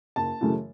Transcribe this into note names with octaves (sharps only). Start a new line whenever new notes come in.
F#1 A5
F#2 C#3 E3 A3